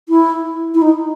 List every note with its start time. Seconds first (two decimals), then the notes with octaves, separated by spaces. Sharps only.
0.09 E4
0.74 E4
0.82 D#4